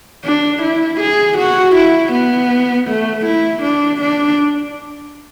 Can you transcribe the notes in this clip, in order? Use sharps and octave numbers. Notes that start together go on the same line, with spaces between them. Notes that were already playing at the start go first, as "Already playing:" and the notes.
D4
E4
G#4
F#4
E4
B3
A3
E4
D4
D4